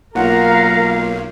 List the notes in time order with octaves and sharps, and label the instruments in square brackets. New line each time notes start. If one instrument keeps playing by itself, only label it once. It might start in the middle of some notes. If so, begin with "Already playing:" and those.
[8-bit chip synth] B1 [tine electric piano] A#3 F4 [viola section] A#4 F5 [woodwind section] F#5 A#5